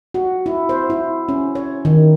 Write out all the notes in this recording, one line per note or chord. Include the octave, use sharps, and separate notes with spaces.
F#4
E4
C5
E4
C#4
C#5
D#3